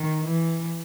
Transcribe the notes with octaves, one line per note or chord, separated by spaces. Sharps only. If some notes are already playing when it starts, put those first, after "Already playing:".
Already playing: D#3
E3